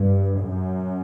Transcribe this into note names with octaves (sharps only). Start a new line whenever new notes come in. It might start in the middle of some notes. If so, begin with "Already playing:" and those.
Already playing: G2
F#2